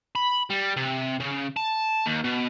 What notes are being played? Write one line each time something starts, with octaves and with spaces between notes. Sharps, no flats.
B5
G3
C3
C#3
A5
D#2
B2